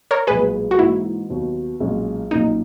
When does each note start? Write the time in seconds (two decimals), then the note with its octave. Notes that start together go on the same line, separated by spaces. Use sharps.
0.11 A#4 C#5
0.27 B1 A#2 G#3 G#4 B4
0.71 F#4
0.78 G#2 E3 A#3 D#4 E4
1.29 D#2 D#3 F#3 B3
1.80 B1 A#2 G#3 C#4
2.31 B1 A#2 A#3 C#4 D#4